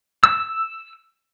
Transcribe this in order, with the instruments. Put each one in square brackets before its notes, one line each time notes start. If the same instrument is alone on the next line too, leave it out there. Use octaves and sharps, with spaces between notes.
[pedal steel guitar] E6